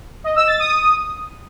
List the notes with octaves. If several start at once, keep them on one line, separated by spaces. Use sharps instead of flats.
D#5
E6
A6
D#6